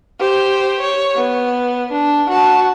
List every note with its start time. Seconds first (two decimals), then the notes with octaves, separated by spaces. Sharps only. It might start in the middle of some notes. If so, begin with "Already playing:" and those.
0.19 G4 C5
0.81 C#5
1.16 B3
1.92 D4
2.29 F#4 A5